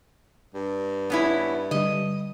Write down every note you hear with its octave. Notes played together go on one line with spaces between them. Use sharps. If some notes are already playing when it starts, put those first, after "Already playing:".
G2
B3 C#4 E4
D3 G3 D#5